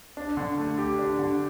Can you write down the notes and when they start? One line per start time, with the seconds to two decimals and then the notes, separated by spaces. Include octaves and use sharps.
0.17 D4
0.37 D3
0.58 A3
0.78 G4
0.99 D4
1.19 D3